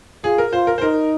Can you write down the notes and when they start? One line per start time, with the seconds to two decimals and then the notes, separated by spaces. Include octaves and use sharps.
0.24 F4 G#4
0.38 A#4
0.53 F4 C5
0.67 A#4
0.78 C5
0.82 D#4 A#4